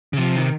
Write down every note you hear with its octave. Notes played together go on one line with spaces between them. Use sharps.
C#3
C3 F3
D#3